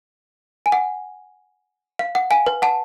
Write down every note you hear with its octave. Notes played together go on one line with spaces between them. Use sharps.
G#5
F#5
F5
F#5
F5 G#5
B4
F#5 A5